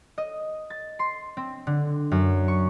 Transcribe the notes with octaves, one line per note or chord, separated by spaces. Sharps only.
D#5
A6
C6
C4
D3
F#2
C#6